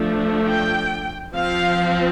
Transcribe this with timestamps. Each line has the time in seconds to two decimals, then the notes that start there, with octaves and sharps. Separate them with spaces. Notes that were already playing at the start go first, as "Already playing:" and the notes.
Already playing: F3 A3 D4
0.46 G5
1.34 F3 C4 F5